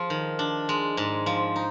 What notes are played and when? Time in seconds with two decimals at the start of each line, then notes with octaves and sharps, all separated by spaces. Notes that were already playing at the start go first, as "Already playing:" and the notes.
Already playing: F3 F4 G#4
0.10 D#3
0.39 D4
0.69 G#3
0.97 G#2
1.26 F3
1.56 D#4